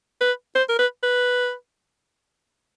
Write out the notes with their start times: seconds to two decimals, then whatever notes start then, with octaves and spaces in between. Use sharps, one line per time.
0.21 B4
0.55 C5
0.69 A#4
0.79 B4
1.03 B4